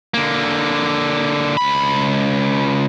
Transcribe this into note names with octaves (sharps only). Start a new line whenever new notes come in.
D3 A#3
C#2 B5